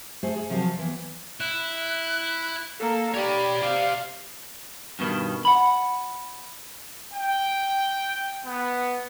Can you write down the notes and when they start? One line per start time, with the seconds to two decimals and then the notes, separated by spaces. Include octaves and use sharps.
0.23 A3 G#4 C5
0.36 G#4
0.50 C3 F3 F#3 A#4 A5
0.64 F3
0.79 E3 B3
1.40 E4 F#6
2.79 A#3 A4
3.15 G4 C#5 D5 B5
3.63 G4 C5 F5
4.99 G2 B2 D#3
5.45 F#5 B5
7.13 G5
8.44 B3